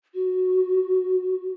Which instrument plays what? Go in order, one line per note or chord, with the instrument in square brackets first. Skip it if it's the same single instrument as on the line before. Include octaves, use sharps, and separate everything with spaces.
[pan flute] F#4